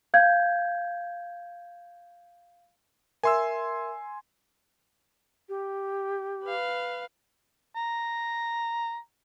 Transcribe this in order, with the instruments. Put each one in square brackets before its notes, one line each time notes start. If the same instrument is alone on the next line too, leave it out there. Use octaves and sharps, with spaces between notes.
[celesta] F5 G6 G#6
[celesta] A#4 E5 [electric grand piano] G#5 C6 E6
[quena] G4
[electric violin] B4 F5
[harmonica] A#5